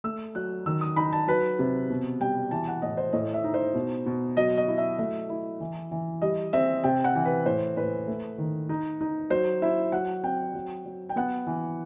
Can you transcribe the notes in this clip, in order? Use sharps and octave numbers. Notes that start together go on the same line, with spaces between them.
A3 E6
F#3 F#6
D#3 E6
D#6
D#4 B5
A5
F#3 B4
C3
B2
G3 G5
E3 A5
F#5
A2 D#5
C5
A2 D#5
E5
D#4
C5
B2
B2
F#3 D#5
D#5
E4
E5
A3 E5
E4
E3
E3
G3 D#5
C4 E5
C3 G5
F#5
E3
B4
A2 C5
A2 B4
A3
D#3
D#4
D#4
F#3 C5
E4 E5
F#3 F#5
C4 G5
F#3
F#3
G5
B3 F#5
E3